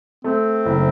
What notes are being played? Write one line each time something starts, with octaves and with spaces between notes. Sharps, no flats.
A3 C4
F#1